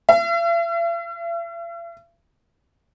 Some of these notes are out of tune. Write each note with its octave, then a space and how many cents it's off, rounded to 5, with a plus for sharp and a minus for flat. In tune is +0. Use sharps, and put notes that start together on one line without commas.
E5 +45